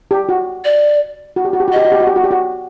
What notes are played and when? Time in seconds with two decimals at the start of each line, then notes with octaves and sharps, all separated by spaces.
0.11 G4
0.29 F#4
0.65 D5
1.36 F#4
1.45 G4
1.53 F#4
1.60 G4
1.68 F#4
1.72 G4 D#5
1.85 F#4
1.92 G4
2.00 F#4
2.07 G4
2.16 F#4
2.24 G4
2.31 F#4